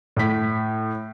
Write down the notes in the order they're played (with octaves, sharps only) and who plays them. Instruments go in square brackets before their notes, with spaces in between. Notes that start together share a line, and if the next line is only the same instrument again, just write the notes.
[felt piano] A2 B6